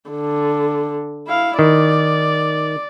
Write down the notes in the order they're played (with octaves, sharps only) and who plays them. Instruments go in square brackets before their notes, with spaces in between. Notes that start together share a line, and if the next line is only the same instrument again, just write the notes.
[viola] D3
E4 F5
[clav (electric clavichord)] D#3 [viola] D5